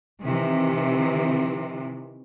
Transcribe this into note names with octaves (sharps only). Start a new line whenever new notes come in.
C3 D#3 E3